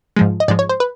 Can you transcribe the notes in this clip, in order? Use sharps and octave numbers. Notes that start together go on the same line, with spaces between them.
G#2 F3 G#3
D#5
G#2 F3 G#3 D5
C#5
C5
B4